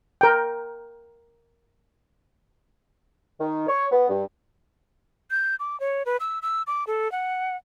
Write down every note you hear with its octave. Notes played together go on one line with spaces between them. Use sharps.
A#4 G5
D#3
C#5
B3
G2
G6
D6
C#5
B4
E6
E6
D6
A4
F#5